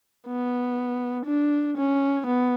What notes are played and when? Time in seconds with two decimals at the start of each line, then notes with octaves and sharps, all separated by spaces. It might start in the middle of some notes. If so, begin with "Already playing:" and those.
0.28 B3
1.26 D4
1.77 C#4
2.26 B3